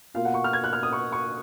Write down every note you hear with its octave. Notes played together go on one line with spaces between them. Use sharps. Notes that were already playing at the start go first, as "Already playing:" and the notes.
B2 A#3 F4 F5
F#5
C#6
F6
G#6
F#6
F6
D#6
C#6
C#6